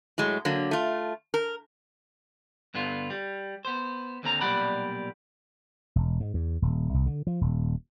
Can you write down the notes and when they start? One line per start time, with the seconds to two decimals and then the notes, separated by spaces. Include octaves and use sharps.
0.18 A2 F#3 G#3
0.45 D3 F#3 A#3
0.71 A3 F4
1.34 A#4
2.74 G2 D3 B3 F4
3.10 G3
3.65 B3 C5
4.23 D#2 D3 C4 A#5
4.41 B1 A#2 G3 D5 F#5 B5
5.96 E1
6.20 G#2
6.34 E2
6.62 D#1
6.94 C2
7.06 D3
7.27 F3
7.41 D#1